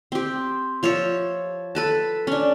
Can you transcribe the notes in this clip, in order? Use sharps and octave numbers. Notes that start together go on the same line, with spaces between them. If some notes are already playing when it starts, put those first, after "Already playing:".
C4 G4
F3 C#5 E5 C#6
A4 B4 A5
C#4 D4